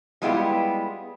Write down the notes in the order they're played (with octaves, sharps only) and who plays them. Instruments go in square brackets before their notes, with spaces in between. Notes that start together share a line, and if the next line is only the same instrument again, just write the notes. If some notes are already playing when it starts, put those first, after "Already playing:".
[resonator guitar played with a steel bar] G3 G#3 B3 E4 F4 G4